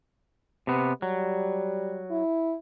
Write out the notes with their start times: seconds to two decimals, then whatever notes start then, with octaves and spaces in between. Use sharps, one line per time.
0.67 C3 B3
1.02 F#3 G3
2.11 E4